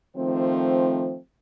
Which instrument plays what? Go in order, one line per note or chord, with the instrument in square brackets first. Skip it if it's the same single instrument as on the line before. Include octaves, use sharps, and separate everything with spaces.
[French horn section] D#3 F3 A3 C4